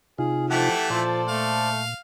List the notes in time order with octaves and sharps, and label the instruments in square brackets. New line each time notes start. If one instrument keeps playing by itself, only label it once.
[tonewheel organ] C3 D#4 F4 [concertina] G#4
[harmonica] E3 A3 E4 [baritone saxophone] F3 [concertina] G4 A4 F#5
[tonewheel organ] A#2 [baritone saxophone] F3 [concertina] A4 C5 D5
[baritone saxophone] A3 [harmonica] F5